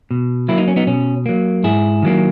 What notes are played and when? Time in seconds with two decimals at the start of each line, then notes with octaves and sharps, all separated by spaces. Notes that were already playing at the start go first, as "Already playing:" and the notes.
0.11 B2
0.48 F#3 A#3 E4
0.58 D#4
0.68 C#4
0.76 B3 D#4
0.87 B2 C#4
1.26 F#3 A#3
1.64 G#2 E4 G#4
2.03 D#3 F#3 A#3